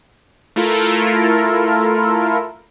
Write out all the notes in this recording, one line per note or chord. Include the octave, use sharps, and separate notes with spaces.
A3 E4 F4 A4 A#4